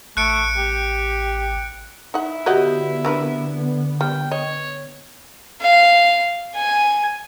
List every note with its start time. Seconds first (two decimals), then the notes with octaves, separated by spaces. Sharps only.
0.17 A1 A3 F#6 C#7 D7
0.57 G4
2.14 D#4 E4 F#5
2.46 D3 B3 F#4 G4 C#5 D#5 F#5
3.05 C4 D4 A#4 B4
4.01 G3 G5
4.31 C#5 D#5
5.61 F5
6.55 G#5